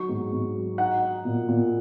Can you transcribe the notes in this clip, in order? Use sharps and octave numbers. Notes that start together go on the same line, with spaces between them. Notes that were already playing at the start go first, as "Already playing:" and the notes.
Already playing: F#3 D#4 C#6
G#2
G#2
F#3
D#4 F#5
D#4
A#2
A#2